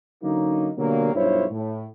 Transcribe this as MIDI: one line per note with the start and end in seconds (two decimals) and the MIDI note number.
0.22 0.70 50
0.22 0.70 54
0.22 0.70 58
0.22 0.70 61
0.22 0.70 63
0.77 1.12 47
0.77 1.12 50
0.77 1.12 54
0.77 1.12 55
0.77 1.12 58
1.14 1.45 35
1.14 1.45 43
1.14 1.45 64
1.14 1.45 65
1.14 1.45 72
1.14 1.45 73
1.50 1.85 45